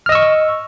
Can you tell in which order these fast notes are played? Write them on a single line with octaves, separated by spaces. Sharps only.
F6 D#5 E6 C#6